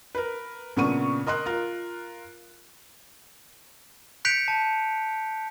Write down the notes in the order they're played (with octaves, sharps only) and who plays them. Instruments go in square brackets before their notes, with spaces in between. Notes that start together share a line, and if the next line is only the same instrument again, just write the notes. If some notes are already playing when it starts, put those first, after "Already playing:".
[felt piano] A#4 B4
A#2 C#3 B3 D4 C#6 D#7
A#4 D#5 C6 F#6
F4 A#4
[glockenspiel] F#6 G6 B6 C#7 D7 F7
A5